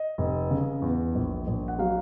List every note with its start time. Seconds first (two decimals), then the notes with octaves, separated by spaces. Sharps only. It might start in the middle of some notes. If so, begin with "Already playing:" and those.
Already playing: D#5
0.18 F1
0.51 C#3
0.82 E2
1.15 A#1
1.47 A#1
1.68 F#5
1.79 F#3 F5